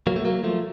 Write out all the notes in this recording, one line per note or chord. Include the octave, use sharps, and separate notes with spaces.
F#3 A#3
A3
F#3 A#3
F3 A3